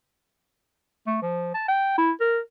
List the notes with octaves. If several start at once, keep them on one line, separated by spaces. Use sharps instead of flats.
A3
F3
A5
G5
E4
A#4